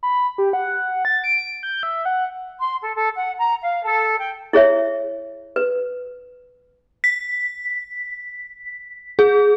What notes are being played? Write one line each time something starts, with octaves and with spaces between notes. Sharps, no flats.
B5
G4
F#5
A6
D7
G6
E5
F#5
C6
A4
A4
F#5
A#5
F5
A4
G5
E4 G#4 C#5 E5
B4
B6
G#4